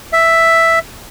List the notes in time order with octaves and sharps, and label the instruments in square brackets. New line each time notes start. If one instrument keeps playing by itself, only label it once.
[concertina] E5